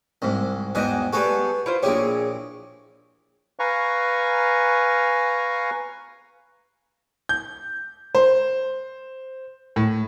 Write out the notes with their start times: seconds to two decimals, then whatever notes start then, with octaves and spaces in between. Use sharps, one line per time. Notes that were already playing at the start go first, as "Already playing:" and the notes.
0.22 C2 G#2
0.75 E2 G#2 F#4 D#5 G5 G#5
1.13 G3 B3 F#4 G#4 A4 B4
1.66 E4 F4 C5
1.83 A#1 E4 G4 G#4 C#5
3.59 B4 F5 G#5 A#5 C#6
7.29 G6
8.15 C5
9.76 A2